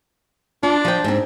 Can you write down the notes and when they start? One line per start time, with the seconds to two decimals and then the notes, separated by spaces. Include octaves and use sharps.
0.63 D4 F4
0.85 F3 G5
1.04 G#2 C4